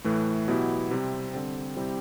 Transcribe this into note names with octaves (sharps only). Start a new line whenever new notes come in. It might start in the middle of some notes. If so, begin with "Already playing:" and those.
A2 E3 A3
B2 F#3 B3 E4 G4
C3 G3 C4
D3 G3 C4
C3 G3 C4 E4 G4